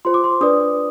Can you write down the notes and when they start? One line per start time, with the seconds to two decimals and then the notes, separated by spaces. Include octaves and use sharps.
0.05 F4 G#4 C5 C6
0.14 D6
0.24 C6
0.41 D4 G#4 B4 D5 D#6